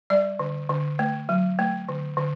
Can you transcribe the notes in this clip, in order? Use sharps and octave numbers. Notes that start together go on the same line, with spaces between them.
G3 D5
D3
D3
A3
F#3
A3
D3
D3